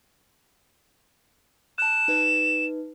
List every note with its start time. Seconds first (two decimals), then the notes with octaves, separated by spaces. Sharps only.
1.78 A5 F#6 E7
2.08 D#4 B4